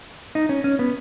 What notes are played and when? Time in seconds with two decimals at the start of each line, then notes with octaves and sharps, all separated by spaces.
0.35 D#4
0.49 C#4
0.64 C#4
0.79 B3